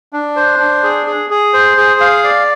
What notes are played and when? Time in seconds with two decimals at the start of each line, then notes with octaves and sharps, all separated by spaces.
0.13 D4
0.36 C5
0.59 D4
0.83 G#4
1.06 G#4
1.30 G#4
1.53 C5
1.77 G#4
2.00 F5
2.24 D5